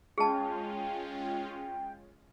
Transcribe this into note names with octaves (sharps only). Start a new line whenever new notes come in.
G#3 C#4 F4 G#4 G5 A5